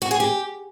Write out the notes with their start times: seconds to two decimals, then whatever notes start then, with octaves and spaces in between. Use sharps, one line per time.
0.02 F#4
0.11 G#4
0.20 G4